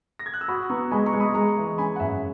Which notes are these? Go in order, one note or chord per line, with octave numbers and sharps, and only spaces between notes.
A#6
G#6
F#6
E6
F#4 B5 D#6
B3 A#5 C#6
G#3 G#5 B5
A#5 C#6
G#3
B5 D#6
G#3 A#5 C#6
E3
C#4 G#5 B5
F#5
F#2 E5 G#5